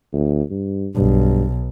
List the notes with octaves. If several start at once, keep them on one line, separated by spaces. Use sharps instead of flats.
D2
G2
B1 G2